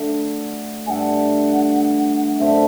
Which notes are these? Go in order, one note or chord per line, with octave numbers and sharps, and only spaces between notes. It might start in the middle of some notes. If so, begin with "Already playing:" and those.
Already playing: D3 F#3 A3 E4
G2 D3 A3 F#5 G#5
F#2 D3 A3 C4 E5